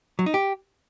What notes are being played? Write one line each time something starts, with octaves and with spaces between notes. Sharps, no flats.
F#3
D#4
G4